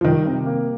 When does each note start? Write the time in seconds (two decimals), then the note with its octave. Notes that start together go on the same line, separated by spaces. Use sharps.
0.01 F3
0.05 D#3 G3
0.26 C3
0.46 A#3